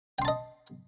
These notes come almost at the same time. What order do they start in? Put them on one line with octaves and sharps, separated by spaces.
G5 C6 A5 D#5